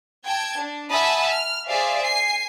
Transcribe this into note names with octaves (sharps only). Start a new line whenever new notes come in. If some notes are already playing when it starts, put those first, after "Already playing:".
G5 A5 G#6
D4
E5 F#5 G#5 A5 B5 D#6
F6
G#4 C5 D5 E5 F5
G#5 C7